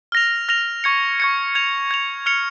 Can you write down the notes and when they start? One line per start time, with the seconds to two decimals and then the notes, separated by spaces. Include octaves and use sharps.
0.12 F6 A#6 F7
0.49 F6 A#6 F7
0.84 C#6 G#6 C#7
1.20 C#6 G#6 C#7
1.55 G#6 F7
1.91 G#6 F7
2.26 F6 C#7 F7